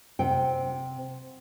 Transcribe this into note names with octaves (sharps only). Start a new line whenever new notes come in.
C3 F#5 G5